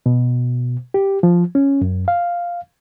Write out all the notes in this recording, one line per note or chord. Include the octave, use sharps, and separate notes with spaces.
B2
G4
F3
C#4
F#2
F5